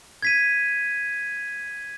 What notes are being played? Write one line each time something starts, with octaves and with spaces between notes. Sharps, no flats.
G#6 B6 D#7